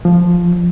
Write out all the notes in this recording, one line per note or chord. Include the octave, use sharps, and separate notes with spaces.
F3